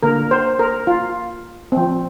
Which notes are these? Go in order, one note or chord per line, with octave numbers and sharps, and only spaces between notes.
D3 A#3 A#4
C5
A#4
F4
F3 C4